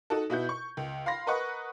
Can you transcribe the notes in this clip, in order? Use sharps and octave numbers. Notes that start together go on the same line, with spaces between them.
D#4 F#4 A4
B2 E4 F#4 G6
C#6
C#2
F5 B5 C6 A#6
A#4 B4 D#5 F#5 C#6 F#6